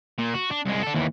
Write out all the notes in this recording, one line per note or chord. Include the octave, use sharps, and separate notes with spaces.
A#2
F#4
D4
C2 G#3
D4 A4
D#2 E3